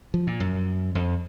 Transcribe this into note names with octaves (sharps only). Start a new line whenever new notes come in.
F3
A#2
F#2
F2